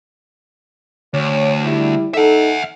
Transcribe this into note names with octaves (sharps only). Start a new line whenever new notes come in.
D2 C#5
G3 E4
D#4 A4 E5 F#5